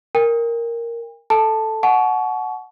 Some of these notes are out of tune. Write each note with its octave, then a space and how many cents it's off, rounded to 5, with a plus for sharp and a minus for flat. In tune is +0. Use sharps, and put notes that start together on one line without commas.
A#4 +0 G5 +45
A4 +0 A5 +0
F#5 +0 A5 -40 C#6 +20